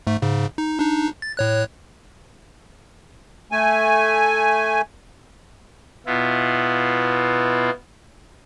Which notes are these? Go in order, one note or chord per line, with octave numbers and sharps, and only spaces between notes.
G#2 A3
G#2 C#3
D#4
D4 D#4
A6
A2 C#5 F#6
A3 G#5
B2 B3 E4 F4